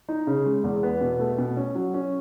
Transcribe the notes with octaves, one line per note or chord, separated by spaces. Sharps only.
D#4
C#3
G#3
E2
B3
B2
A3
B2
C#4
F#3
C#4